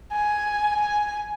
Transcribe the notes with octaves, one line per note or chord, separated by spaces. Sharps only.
G#5
G#5